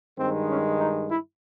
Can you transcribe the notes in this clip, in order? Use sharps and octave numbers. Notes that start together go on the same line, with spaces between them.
G2 D#3 G#3 C4
C#4
D#4
E4